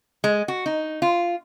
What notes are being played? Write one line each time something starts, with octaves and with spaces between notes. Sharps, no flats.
G#3
F#4
D#4
F4